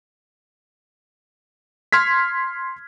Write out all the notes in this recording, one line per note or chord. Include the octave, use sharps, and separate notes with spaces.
C6 F6 G#6 B6